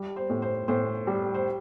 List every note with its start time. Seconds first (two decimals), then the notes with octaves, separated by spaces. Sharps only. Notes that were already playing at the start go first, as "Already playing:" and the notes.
Already playing: G3
0.16 C5
0.30 A2
0.42 C5
0.68 A2 C5
1.07 G3
1.34 C5